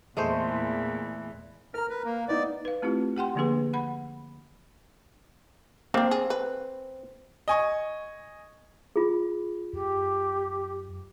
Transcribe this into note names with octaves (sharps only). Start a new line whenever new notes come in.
E2 A#2 E3 G#3 A3 C5
A#4 A#5 F6
B4
A#3
B3 D#4 D5
B4 F5
A3 C4 E4 F4 G4
G4 F#5 G5 C6
D3 F3 A#3 D4 G#4 B4
F#5 B5
A#3 C4 D4
G#4
B4
D#5 G#5 C#6
F4 G#4
F#2 G4